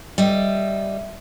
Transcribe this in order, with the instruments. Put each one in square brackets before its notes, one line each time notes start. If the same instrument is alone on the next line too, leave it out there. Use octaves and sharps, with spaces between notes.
[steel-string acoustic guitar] G3 D#5 E5